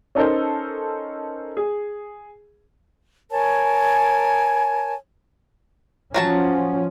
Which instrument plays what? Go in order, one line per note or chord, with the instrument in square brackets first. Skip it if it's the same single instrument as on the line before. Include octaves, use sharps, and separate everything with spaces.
[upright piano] C#4 D#4 A4 A#4 C5
G#4
[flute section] A#4 C#5 G#5 A5
[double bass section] F3 C#4 [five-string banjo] F#3 F#4 A5